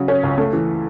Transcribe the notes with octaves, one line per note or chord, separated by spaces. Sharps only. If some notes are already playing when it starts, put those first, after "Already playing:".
Already playing: C#3 F#3
C#4
C#2
A3
E3